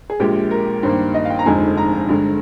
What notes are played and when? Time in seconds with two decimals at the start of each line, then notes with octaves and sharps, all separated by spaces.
0.10 G#4
0.20 A#1 A#2 G#3 G4
0.51 A#4
0.83 G2 D#3 A#3 C5
1.14 D#5
1.25 F5
1.30 G5
1.39 A#5
1.46 F1 F2 D3 G#3 D#4 G#5
1.77 A#5
2.09 G2 D3 G#3